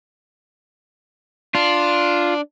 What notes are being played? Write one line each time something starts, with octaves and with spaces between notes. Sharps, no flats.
D4 F4